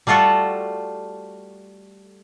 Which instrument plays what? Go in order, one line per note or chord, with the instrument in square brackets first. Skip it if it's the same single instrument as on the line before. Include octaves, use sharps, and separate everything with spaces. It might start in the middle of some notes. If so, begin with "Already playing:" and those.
[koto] G3 A3 F4 F#4 A4